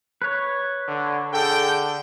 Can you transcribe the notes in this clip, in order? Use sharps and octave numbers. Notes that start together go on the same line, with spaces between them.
B4 C#5
D3
D3 G#4 A4 G5